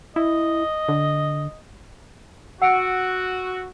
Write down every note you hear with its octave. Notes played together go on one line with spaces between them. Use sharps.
E4 D#5
D3
F#4 F#5 E6 C#7 D7